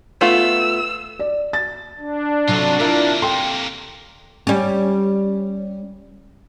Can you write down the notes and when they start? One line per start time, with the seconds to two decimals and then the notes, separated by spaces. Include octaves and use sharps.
0.21 A3 B3 F4 E6
1.19 D5
1.53 A6
1.99 D4
2.48 C3 F#3 F4 F#4 A4
2.80 C3 A#3 E4 F4 A#4
3.22 A4 G5 C6
4.47 G3 C#4